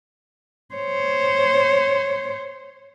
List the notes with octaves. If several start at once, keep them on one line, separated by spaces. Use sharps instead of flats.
C5 C#5